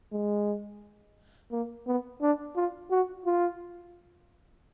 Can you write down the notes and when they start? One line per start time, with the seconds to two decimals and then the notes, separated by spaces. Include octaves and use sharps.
0.13 G#3
1.51 A#3
1.87 B3
2.22 D4
2.56 F4
2.91 F#4
3.26 F4